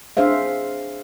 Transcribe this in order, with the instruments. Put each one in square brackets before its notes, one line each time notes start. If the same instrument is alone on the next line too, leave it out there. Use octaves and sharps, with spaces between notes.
[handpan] D4 G#4 C5 E5 F5